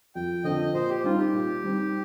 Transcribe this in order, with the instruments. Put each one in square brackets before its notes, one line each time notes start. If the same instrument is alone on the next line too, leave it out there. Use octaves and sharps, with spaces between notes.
[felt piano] F2 [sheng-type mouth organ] G5
[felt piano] D3 F3 C4 [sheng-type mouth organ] D#5
[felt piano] A#2 [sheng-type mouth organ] C5
[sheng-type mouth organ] G4
[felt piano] G3 C4 D#4 [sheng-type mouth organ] F4
[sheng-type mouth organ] G4
[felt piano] A#2
G3 C4 D#4